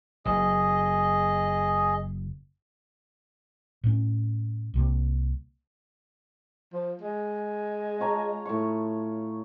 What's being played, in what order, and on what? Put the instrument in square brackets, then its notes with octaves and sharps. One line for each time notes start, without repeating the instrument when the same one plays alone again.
[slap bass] F#1 [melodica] G#4 D#5
[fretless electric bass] A2 C#4
C2 C3 A#3
[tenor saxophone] F3
G#3
[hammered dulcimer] F4 C#5 A#5
A2 C#6